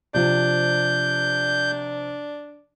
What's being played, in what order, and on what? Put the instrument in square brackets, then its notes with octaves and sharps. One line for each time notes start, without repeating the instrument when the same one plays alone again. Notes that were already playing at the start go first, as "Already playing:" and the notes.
[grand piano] C3 F3 [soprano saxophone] D4 [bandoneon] G6